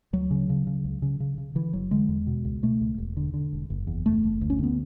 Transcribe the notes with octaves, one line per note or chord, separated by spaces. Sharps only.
D2 F#3
C#3
C#3
C#3
C#2
C#3
C#3
C#3
D3 E3
F#1 F#3
D3 G#3
E2
B2
C#2
B2 A3
C#2
E1
D3
D3
E1
F#1
E2
F#1 A3
F#1
D2
C#4
D2 B3